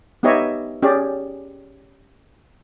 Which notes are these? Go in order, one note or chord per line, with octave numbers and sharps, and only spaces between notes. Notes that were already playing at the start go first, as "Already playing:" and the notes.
B3 D#4 G4 C#5 D#5 E5
C#4 G4 G#4 D5